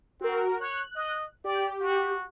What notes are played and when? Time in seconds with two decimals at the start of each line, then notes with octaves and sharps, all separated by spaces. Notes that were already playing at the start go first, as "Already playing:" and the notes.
0.21 C4 F#4 A#4
0.60 C#5 F#6
0.96 D#5
1.44 G4 D5
1.80 F#4